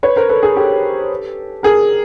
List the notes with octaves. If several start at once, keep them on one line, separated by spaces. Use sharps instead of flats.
B4 C#5
A#4 C5
A4 B4
G#4 A#4
G4 A4
G#4 A#4